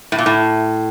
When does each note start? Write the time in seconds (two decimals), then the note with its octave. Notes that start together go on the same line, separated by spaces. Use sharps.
0.12 A2
0.18 A#2
0.26 A2